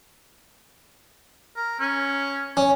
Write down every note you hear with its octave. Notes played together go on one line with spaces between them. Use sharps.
A#4
C#4
C#4